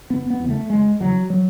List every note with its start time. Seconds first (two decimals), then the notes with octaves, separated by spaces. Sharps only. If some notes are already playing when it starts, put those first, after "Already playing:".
0.10 F#1 B3
0.30 B3
0.40 E2 C#3
0.50 A3
0.70 F#1 G#3
1.00 E2 C#3 F#3
1.30 F#3